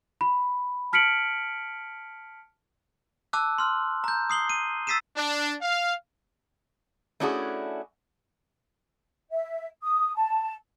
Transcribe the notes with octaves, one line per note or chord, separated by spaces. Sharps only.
B5
A5 F6 B6 C#7 D7 F#7
A5 D6 E6 F#6
C6 F6
A#5 G6
D#6 C7 F#7 G7
D#7
E6 A6 B6 C7 D#7 E7
D4
F5
A3 C#4 D4 E4 F#4 G#4
E5
D#6
A5